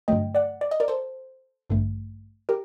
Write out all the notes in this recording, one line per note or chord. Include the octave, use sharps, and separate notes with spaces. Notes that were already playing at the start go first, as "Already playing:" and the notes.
G2 D3 F#3 A3 D#5 G5
D5 F#5
D5
D#5
A#4 D5
A4 C5
A1 G2 D3 A3
G4 A#4